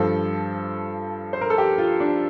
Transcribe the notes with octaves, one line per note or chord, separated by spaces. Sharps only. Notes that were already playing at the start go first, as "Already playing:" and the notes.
Already playing: G2 F3 A4
C5
A#4
A4
G4
F4
D4